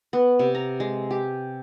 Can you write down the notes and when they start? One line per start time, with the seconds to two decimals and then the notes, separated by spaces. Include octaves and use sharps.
0.13 B3
0.39 C3
0.55 A#5
0.80 G#3
1.11 G4